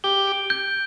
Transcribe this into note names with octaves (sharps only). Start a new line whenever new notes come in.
G4 G7
D7
G6